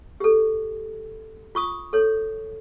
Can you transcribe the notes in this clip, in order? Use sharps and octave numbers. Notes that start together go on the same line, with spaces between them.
G4 A4
F4 C#6 D#6
A4 C#5